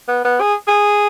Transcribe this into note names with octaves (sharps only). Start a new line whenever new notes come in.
B3
B3
G#4
G#4